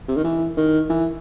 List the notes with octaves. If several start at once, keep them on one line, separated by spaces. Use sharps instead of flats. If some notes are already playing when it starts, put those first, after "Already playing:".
C3
D#3
E3
D#3
E3